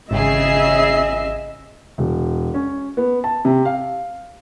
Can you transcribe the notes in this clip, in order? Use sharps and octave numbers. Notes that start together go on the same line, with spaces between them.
G#1 C#3 G#4 D#5 E5 C7
E1
C#4
B3
A5
C3
F5